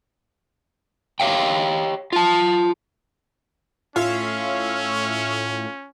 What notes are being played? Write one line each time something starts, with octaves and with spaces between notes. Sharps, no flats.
G4 C#5 F5 G5
F4 A5
A2 C#4 F4 C#5 E5 F5